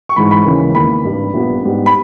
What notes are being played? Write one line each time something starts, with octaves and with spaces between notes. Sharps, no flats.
C#6
G#1 G#2 E3 G#3 B5
B5
D#2 C#3 E3 G#3 C#4
E2 D#3 A#3 B5
G#1 G2 G3
A#1 A#2 G3 B3
G#2 G3 B3
B5